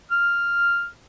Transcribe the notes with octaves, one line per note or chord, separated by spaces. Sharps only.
F6